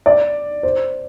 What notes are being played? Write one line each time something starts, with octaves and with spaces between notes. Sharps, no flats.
D5
C5